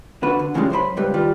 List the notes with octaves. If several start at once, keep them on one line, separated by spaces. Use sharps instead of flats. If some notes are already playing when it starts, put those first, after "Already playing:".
D3 F#4 B4
D3
A2 C#3 E3 F3 G3 G#3
F#2 C5 C#5 B5
C#2 G#2 G3 B4
D#3 G3 F4